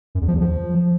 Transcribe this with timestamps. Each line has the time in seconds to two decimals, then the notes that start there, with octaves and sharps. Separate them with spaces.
0.15 F#2
0.21 E2
0.28 F3
0.34 E2
0.41 F3